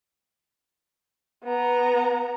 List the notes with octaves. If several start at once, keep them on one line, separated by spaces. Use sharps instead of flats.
B3 A#5